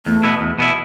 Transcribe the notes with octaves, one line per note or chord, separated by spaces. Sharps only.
E2 A3
B2 B3 E4
E2
B2 B3 E4